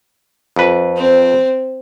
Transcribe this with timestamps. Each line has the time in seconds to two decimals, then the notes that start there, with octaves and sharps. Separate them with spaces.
0.56 F2 B4
0.96 C4